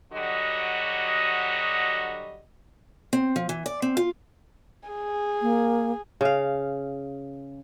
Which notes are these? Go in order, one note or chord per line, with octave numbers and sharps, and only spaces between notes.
D3 F#3 G3 F#4 D#5
C4
F3
E3
D5
C4
F4
G#4
A#3
C#3 F5